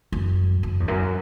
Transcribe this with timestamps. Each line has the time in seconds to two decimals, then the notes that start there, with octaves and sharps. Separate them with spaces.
0.12 F#2
0.63 F#2
0.80 E2
0.88 F#2